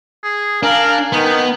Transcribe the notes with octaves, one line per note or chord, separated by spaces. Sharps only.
G#4
D4 A#4 F5 G#5
D#3 B3